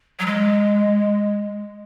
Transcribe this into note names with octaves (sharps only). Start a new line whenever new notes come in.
F#3
G#3